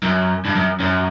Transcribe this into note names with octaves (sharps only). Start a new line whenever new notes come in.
F#2
G2
F#2
F#2